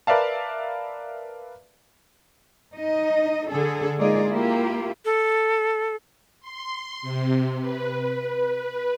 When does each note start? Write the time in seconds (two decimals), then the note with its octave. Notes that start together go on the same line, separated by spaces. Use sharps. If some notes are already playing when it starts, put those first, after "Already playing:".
0.07 A#4 B4 D5 E5 F5 A5
2.75 D#4 D#5
3.50 D3 G#4 A4
3.99 G#3 A#3 D#4 F4 G#4 D5
4.29 A#3 E4 F4 G4
5.05 A4
6.41 C6
7.02 C3
7.60 B4